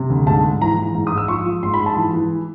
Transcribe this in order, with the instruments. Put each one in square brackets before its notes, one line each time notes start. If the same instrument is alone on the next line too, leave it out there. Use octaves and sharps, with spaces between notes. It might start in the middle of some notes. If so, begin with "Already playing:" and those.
Already playing: [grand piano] C3
D2
G#2 A5
G#2
E3 A#5
E3
G#2
D#6
G#2
E6
F3 C#6
F3
G#2 C6
B5
G#2
A5
E3
E3